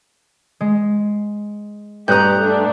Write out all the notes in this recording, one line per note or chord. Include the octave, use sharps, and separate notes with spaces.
G#3
G2 G4 A#5 D#6 F#6 G6
A3 D4